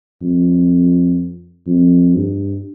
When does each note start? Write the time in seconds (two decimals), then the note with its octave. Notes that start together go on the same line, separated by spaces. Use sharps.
0.21 F2
1.67 F2
2.15 G2